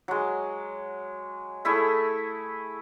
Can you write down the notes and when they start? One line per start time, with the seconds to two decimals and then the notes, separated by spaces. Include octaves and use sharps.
0.08 F#3 G#3
1.65 A3 E4 G#4 E5